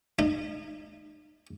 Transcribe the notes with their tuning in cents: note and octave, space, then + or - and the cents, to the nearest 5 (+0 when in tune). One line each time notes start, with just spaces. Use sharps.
D#4 -35